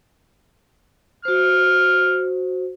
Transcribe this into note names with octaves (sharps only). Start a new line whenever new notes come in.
F#4 C5 F6